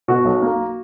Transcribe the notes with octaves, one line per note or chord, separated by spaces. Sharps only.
B2 F#4
B1
A#3